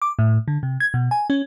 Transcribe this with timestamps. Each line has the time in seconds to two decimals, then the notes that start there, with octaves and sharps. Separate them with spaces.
0.02 D6
0.19 A2
0.48 D3
0.63 C3
0.80 G#6
0.94 B2
1.11 G#5
1.30 C#4